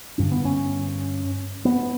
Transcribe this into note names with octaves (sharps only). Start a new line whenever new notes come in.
G2 D3 C#4
B3
C#4
B3